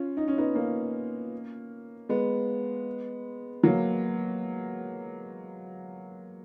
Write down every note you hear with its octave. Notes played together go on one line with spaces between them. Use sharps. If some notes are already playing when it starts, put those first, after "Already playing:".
Already playing: C#4 F4
D#4
C#4
B3 D#4
A#3 C#4
G#3 B3
F#3 A#3